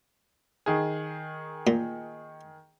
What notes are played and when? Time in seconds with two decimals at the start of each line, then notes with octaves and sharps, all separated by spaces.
0.66 D#3 G#4
1.67 A#2